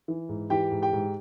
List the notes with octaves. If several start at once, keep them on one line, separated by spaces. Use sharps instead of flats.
E3
G#2
E3 G4 G5
G#2
G4 G5
G#2